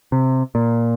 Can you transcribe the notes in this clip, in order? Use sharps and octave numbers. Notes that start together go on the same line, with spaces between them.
C3
A#2